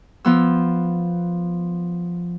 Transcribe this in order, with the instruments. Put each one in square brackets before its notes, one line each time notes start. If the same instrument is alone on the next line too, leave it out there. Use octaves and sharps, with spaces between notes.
[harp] F3 B3 E6